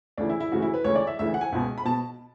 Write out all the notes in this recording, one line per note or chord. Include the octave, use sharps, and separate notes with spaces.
D2 C#3 E3 D4
E4
E4
D2 C#3 E3 F#4
E4
B4
D2 C#3 E3 C#5
D5
E5
D2 C#3 E3 E5
F#5
G#5
C#2 B2
B5
B2 A5